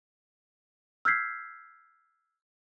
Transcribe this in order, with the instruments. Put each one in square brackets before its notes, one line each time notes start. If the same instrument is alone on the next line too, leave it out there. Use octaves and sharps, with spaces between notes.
[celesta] E6 F6 G6 G#6 B6 C7